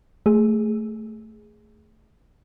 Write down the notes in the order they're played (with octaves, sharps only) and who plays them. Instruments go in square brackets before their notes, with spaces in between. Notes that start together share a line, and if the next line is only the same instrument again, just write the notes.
[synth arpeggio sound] A3 G#4